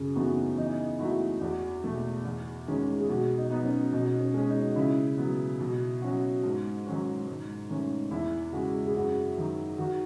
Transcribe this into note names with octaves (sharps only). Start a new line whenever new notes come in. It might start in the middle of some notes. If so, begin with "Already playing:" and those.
Already playing: F#2 C#3
E3 A3 B3 D#4 F#4
E3 D#4
A3 D#4 E4 F#4
E2 F#4
B2 A3
E2
D#3 G#3 C#4
G#4
B2 F#4
D#4
F#3 B3 D#4
C#4
B2 D#4
C#4
G#3 C#4
D#4
C#3 E4
F#3 B3
B2
F#3 C#4 F#4
G#2
D#3 F#3 C#4 F#4
G#2
D#3 A3 C#4
E2 E4
C#3 G#3 F#4
G#4
F#2 F#4
D#3 F#3
D#3 F#4